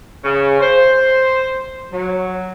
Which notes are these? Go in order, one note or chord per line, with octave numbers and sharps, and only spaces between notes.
C#3
C5
F#3